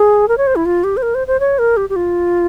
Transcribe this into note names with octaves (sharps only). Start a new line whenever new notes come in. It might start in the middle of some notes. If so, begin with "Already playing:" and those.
Already playing: G#4
A#4
C#5
C5
E4
F4
G4
C5
A#4
C5
C5
C#5
A#4
G4
G4
F4